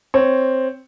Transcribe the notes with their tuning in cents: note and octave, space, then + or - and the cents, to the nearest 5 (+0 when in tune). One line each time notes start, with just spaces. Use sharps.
C4 +0 C#5 +0